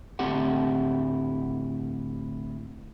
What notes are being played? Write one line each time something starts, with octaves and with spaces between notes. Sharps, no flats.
D2 A2 C4 E4 G4 F#5